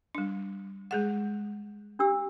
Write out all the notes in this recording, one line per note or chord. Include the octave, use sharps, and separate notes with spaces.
G3 D4
G#3 G#4 F#5
D4 G4 E6